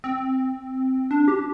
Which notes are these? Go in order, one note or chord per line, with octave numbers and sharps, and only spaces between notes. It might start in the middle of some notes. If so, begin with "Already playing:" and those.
C4
D4
G4